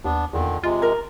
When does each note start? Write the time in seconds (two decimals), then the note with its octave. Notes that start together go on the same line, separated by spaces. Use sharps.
0.05 D#2 B3 D4
0.33 E2 A#2 D3 D#3
0.64 C3 G#3 F4
0.82 A#4